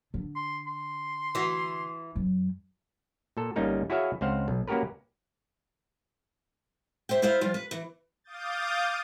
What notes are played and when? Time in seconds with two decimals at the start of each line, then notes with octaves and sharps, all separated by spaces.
0.14 D3
0.36 C6
0.67 C6
1.35 E3 F#4
2.16 F#2
3.37 A#2 A4
3.56 G1 G3 A#3 C#4 D#4 A#4
3.90 E4 F#4 G#4 C#5 E5 F5
4.21 C#2 C4 C5 F5 F#5
4.48 B1
4.68 A#3 C#4 F#4 G4 A#4 B4
7.09 G4 C5 E5 G5
7.22 E4 F4 C5 E5 F5
7.41 F3 G3 F4
7.54 B4
7.71 E3
8.24 F5 D6 D#6 G6 A6